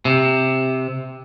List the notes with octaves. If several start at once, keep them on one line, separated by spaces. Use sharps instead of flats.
C3